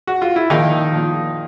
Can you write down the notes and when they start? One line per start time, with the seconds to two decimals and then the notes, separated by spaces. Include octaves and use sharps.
0.07 F#4
0.22 F4
0.36 E4
0.50 A#2 D#3 F3 D#4
0.92 A#2 F3